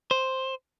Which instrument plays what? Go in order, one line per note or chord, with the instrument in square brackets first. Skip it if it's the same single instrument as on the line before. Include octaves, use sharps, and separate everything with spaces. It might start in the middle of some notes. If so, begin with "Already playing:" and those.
[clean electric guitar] C5